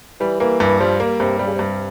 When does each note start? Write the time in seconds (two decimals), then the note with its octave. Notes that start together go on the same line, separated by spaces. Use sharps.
0.20 E3 G3
0.40 E3 A#3
0.60 G2 E3
0.80 F3 G3
1.00 A#3
1.20 G2 C3
1.39 C3 G3
1.47 C#3
1.55 G2 C3